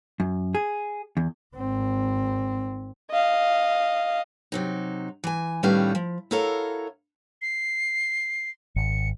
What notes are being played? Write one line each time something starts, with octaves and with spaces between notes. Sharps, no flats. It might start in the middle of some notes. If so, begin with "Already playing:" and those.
F#2
G#4
E2
G#1 C4
D#5 F5
C3 F#3 D#4
E3 G#5
A2 D#3 G3 C#4 B4 F5
F3
E4 F#4 A4 A#4 C#5 F5
C7
G#1 C#7